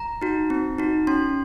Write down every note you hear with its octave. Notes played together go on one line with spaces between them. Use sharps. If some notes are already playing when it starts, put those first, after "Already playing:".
Already playing: A#5
D#4 F#4
C4
D#4 F#4
C#4 C6